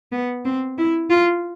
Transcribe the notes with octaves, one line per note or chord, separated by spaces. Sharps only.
B3
C4
E4
F4